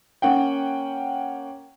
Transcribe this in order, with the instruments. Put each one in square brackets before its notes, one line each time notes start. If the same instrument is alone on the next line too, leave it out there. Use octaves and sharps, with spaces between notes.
[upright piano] A#3 C#4 F#5 G5